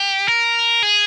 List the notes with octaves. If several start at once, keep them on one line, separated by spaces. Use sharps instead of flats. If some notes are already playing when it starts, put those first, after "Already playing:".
Already playing: G4
A#4
G#4